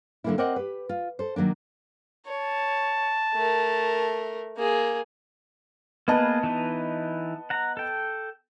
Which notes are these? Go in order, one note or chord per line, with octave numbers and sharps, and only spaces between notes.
D3 F#3 A3 A#3 D4 E4
C4 A#4 C5 D5 D#5 F#5
G4 B4
F4
A4 C5
D#3 F#3 A#3 D4
C#5 A5
A3 A#4
A#3 G#4
A#3 B3 G#4 B4 D#5 A5
E3 D#4 B4
F#5 A#5
A4 G5